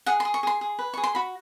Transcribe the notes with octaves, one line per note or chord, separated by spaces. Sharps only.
G#4 F#5
C6
G#4
C#6
G#4 C6
G#4
B4
G#4 C#6
C6
F#4 B5